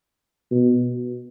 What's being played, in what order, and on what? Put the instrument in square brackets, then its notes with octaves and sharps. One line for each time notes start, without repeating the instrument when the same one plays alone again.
[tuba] B2